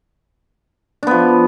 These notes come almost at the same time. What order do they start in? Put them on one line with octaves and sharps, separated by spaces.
D4 B3 F3